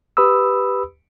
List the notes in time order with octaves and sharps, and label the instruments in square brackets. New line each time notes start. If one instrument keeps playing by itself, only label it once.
[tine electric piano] G4 B4 B5 D#6 E6